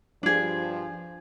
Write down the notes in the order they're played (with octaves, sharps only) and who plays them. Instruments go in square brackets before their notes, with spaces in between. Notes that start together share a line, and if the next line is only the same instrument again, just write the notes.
[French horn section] G2 F3 [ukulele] D4 G#4